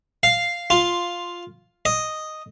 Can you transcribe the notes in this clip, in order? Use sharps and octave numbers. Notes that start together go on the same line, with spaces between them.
F5
F4
D#5